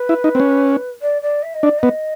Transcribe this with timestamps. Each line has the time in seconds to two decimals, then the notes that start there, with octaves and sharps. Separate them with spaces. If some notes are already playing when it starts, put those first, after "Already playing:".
Already playing: B4
0.09 E4
0.24 D#4
0.35 C4
0.40 C#4
1.01 D5
1.22 D5
1.42 E5
1.54 D#5
1.63 D4
1.67 D5
1.78 B3 D#5